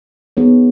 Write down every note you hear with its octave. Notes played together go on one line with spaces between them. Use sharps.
B3 D#4 G#4 C#5